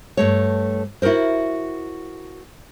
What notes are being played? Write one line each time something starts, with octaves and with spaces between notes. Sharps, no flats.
G2 A3 C#5
E4 F#4 A4 A#4 C5